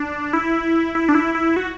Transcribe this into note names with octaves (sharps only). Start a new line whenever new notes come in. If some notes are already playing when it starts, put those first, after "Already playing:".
Already playing: D4
E4
E4
D4
E4
E4
F#4